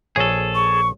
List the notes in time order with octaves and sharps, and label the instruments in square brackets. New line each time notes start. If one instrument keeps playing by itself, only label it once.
[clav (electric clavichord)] A#1 C#5 G#5 [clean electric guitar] G#4 A4
[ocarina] C#6